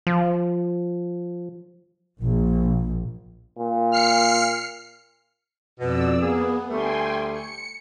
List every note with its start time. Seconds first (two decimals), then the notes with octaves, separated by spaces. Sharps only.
0.07 F3
2.22 A#1
3.59 A#2
3.92 F6 C7 C#7
5.80 F2 B2 D5 E6
6.20 A#3 B3 G#4
6.70 D2 G3 A3 G5 G#5 C6
7.30 C#7